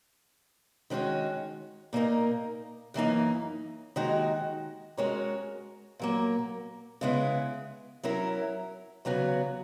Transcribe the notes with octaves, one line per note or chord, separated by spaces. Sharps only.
D#3 G#3 C#4 F#4 C#5
A#2 A#3 D#4 A#4
F#2 E3 A#3 D#4
D#2 D#3 G#3 D#4 F#4
G#3 C#4 F#4 A#4 C#5
A#2 F#3 A#3
C#3 G#3 B3 E4
F#3 C#4 E4 A#4
E2 C#3 F#3 B3 F#4